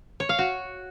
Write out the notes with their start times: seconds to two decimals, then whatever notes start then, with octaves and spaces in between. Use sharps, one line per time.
0.20 C#5
0.29 F5
0.39 F#4